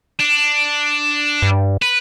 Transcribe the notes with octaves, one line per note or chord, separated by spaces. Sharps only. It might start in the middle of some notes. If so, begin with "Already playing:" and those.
D4
G2
B4